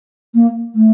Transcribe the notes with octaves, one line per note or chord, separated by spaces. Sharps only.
A#3
A3